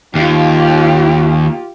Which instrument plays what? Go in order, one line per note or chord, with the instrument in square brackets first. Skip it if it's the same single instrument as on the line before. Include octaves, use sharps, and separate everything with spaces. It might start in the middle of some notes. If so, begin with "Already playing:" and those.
[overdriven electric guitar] D#2 [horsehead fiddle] F4 G4